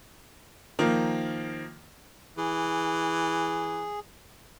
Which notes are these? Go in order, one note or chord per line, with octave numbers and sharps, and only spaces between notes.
D#3 F3 A#3
E3 G#4